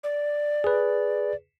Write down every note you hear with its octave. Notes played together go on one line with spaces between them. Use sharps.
D5
G#4 B4